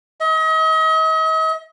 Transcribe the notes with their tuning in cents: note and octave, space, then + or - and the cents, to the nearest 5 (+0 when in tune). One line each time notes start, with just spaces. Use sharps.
D#5 +40